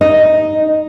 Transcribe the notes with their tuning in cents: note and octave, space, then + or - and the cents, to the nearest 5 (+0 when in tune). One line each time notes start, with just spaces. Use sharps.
D#4 +0 D#5 +5